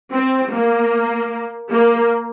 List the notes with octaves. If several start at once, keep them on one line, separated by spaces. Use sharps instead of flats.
C4
A#3
A#3